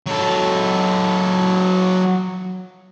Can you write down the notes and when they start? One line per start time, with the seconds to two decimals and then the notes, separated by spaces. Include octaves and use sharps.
0.07 F#3 A4